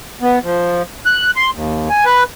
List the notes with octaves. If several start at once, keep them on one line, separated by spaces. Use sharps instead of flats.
B3
F3
F#6
C6
D#2
G#5
B4